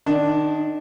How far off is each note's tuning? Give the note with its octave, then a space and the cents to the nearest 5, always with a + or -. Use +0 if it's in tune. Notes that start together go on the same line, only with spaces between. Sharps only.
D#3 -25 D4 +0 D#5 +20